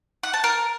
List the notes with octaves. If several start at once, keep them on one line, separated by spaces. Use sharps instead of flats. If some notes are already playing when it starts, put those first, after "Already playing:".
F#5
A5
A#4